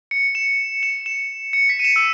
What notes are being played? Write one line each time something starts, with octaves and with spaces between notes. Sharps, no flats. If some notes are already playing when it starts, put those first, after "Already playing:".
C#7
E7
E7
E7
C#7
B6
D#7
E7
E6